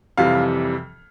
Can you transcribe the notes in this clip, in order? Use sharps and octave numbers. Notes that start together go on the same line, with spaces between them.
F2 C3 E3 G3 F5